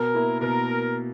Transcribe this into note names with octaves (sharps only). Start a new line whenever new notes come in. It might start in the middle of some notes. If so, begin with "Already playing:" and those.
Already playing: B2 A#4
A#3 E4
B2 A#4